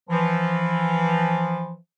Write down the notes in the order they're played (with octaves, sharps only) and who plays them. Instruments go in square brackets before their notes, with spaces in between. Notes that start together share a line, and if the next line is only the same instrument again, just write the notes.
[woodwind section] E3 F3